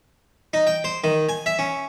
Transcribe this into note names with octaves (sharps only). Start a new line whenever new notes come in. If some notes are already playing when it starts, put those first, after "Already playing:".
D#4
G5
C5
D#3
G#5
E5
C#4